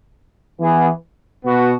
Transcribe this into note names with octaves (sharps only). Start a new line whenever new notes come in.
E3 B3 G#4
B2 B3 F#4